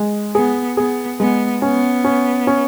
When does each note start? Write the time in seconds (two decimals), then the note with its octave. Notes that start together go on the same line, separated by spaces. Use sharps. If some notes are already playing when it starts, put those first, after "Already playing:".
Already playing: G#3
0.35 B3 G#4
0.77 B3 G#4
1.20 G#3 B3
1.62 B3 C#4
2.04 C#4
2.47 C#4